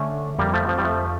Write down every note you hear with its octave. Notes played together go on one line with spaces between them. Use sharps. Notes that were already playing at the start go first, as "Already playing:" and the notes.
Already playing: D3 A3 C#4
F2 G3 A#3
F3 A3
F3
G3
F3 A3